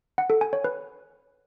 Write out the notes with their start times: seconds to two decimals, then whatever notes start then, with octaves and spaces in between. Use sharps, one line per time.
0.18 F#5
0.30 A4
0.41 G#5
0.53 C#5
0.64 B4